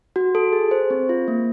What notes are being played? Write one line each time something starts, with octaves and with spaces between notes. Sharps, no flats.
F#4
A4
G#4
C5
C4
F4
A#3